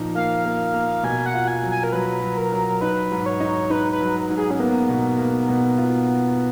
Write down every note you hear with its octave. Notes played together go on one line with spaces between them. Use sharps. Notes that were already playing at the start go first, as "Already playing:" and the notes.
Already playing: A#2 F3 D#4
A#3 F5
A#3
A#3
B2 G#5
F#5
F4
G#5
F#3
G#5
A#4
F#3 B4
F#3
A#4
F#3
D#4 B4
G#2
C#5
D#4
D#4 B4
B4
F#3
G#2
G#4
C#4
A#3 B3
B2
A#3
B2
F4